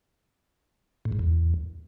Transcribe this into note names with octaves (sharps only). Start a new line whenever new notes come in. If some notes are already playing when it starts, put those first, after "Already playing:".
A2
G#2
E2